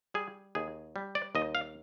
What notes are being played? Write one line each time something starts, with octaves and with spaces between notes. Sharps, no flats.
G3 G#4
D#2 G#4
G3
D5
D#2 D#5
F5